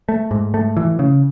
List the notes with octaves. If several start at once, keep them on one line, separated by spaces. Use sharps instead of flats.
A3
G#2
A3
E3
C#3